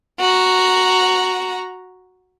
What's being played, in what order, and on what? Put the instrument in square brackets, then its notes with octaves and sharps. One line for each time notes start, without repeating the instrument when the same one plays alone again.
[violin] F#4 A#5